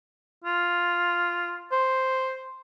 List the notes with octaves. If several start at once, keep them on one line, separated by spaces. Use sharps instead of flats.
F4
C5